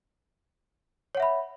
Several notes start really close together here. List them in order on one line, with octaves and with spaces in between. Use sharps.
C#5 F#5 E5 B5